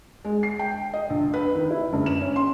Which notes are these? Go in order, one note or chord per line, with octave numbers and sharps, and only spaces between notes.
G#3
C7
G5
D#5
A#1
B4
D#3
E4
F#1
E7
C#4
C6